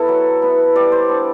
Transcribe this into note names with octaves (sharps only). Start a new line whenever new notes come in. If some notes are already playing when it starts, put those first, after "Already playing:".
Already playing: B3 E4 A4
F#3
B3 E4
G3 D5
C5
B3 D4